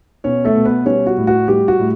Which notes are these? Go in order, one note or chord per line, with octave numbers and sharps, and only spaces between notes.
B2 C#4 C#5
A3 A4
B2
B3 B4
G3 C#4 C#5
F#4
A2
F#4
G3 G4
F#4
A2